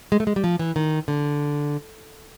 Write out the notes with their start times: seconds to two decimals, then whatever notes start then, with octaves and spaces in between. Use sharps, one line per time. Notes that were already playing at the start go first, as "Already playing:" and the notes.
0.12 G#3
0.20 A3
0.27 G#3
0.36 G3
0.44 F3
0.59 E3
0.76 D#3
1.08 D3